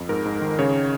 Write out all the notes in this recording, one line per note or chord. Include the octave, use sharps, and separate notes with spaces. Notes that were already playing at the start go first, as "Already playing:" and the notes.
Already playing: F2
G#2 A#4
G#2
D#3
C#3 C#5